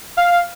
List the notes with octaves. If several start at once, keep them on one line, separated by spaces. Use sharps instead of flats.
F5